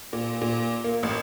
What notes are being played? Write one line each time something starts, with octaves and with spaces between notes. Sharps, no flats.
A#2
A#2
A#3
A1